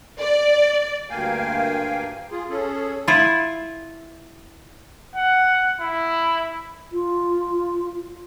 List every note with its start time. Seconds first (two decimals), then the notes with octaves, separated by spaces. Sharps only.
0.20 D5
1.10 D2 G2 A#3 F5 G5 G#5
2.31 F4 G#4
2.49 C#4 G#4 A4
3.08 E4 F4
5.16 F#5
5.80 E4
6.92 F4